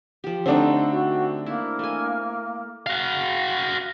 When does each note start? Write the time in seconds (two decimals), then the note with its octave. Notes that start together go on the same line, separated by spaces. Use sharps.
0.24 F3 G4
0.46 D3 A3 C4 D4 D#4
0.91 F#4
1.46 A#3 E4
1.79 A3 G#5
2.86 F#4 F5